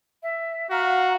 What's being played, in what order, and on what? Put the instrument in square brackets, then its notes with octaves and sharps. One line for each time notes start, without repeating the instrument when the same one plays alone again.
[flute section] E5
[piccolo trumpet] F#4 [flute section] F5 A#5 F6